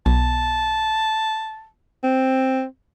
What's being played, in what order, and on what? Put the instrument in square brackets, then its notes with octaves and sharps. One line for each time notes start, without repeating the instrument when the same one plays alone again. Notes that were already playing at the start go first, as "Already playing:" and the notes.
[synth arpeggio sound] B1 [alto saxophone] A5
[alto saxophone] C4